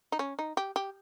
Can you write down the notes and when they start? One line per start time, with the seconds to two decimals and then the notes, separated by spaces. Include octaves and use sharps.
0.12 D#4
0.19 C#4
0.39 D#4
0.57 G4
0.76 G4